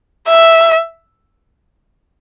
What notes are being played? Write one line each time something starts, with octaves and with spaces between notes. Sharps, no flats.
E5